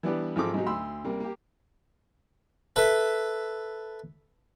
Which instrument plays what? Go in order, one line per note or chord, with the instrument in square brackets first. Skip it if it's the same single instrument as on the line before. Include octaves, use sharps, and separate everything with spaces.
[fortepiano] E3 G3 B3 D4 G4 B4
G#1 F3 C4 A4 D6
G#2 C3 F#3 D#4
D2 B5 C6 E6
C3 G3 A#3
A#3 G4
[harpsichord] A4 B4 E5